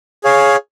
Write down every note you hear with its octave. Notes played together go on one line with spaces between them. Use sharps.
G#4 C#5 F5